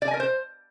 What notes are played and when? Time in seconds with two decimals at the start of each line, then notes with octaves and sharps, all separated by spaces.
0.02 D5
0.08 G#5
0.14 A#4
0.20 C5